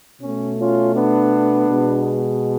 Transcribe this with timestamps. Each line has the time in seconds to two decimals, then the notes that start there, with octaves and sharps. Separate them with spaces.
0.21 B2 A3 C#4
0.59 C#4 F4
0.95 B3 D4
1.68 B2 G#3